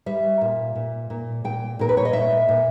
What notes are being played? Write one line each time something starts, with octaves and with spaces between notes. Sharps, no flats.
G3 E5
A#2
A#2
A#2
A#2 G5
A#2 A#4
B4
C#5
D#5
A#2 E5
A#2